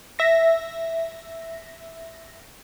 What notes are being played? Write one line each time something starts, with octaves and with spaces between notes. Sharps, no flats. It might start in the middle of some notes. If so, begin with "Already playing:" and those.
E5 A#6